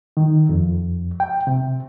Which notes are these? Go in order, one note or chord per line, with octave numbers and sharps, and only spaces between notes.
D#3
F2
G5
C3